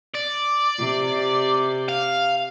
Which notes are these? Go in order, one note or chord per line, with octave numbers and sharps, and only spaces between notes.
D5
C3
F5